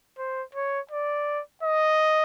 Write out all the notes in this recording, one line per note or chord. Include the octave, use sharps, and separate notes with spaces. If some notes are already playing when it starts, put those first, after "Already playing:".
C5
C#5
D5
D#5